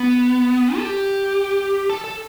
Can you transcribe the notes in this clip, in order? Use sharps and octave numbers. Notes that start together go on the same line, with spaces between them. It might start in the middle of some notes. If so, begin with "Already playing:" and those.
Already playing: B3
A4
G4
A4
A4